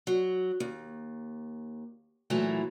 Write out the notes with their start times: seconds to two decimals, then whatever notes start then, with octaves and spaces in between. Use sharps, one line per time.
0.07 F#3
0.60 D#2
2.30 A#2 E3 F#3 A3